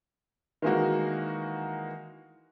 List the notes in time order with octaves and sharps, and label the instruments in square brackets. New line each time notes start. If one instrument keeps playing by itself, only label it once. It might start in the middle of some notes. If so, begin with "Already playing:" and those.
[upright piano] D#3 E3 G#3 A#3 D#4 F#4